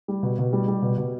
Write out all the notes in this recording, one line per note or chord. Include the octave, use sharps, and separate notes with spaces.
G3
B2
B2
G3
G3
B2
B2